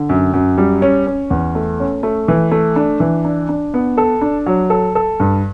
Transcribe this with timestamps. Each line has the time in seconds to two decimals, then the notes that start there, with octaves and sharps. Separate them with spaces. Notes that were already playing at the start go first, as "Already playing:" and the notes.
Already playing: D3
0.09 F#2
0.33 F#2
0.58 G3
0.82 C#4
1.06 C#4
1.30 E2
1.55 A3
1.80 C#4
2.03 A3
2.28 E3
2.52 A3
2.76 D4
3.00 E3
3.25 D4
3.49 D4
3.74 B3
3.97 A4
4.21 D4
4.46 F#3
4.70 A4
4.95 A4
5.20 G2